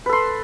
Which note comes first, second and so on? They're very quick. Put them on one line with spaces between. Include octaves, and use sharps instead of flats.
B4 A4 C6